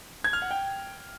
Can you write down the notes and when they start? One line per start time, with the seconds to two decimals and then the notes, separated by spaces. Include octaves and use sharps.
0.24 G#6
0.33 F6
0.42 F#5
0.51 G5